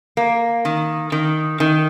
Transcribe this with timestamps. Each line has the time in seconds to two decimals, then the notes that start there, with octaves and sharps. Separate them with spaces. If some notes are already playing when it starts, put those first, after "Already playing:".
0.17 A#3
0.65 D#3
1.12 D#3
1.60 D#3